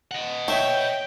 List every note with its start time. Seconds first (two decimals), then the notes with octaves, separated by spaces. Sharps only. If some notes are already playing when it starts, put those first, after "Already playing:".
0.11 D#5 F#5
0.48 C#5 E5 G5